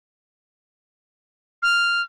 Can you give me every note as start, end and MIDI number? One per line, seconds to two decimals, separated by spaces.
1.62 2.02 89